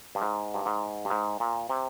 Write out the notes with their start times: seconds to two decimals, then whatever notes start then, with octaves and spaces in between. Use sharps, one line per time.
0.15 G2
0.22 G#2
0.54 G2
0.66 G#2
1.05 G2
1.10 G#2
1.40 A#2
1.69 C3